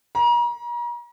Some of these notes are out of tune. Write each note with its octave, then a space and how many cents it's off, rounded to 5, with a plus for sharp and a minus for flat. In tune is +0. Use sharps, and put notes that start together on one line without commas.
A#5 +40